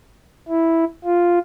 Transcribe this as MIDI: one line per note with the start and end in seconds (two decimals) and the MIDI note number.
0.48 0.84 64
1.04 1.39 65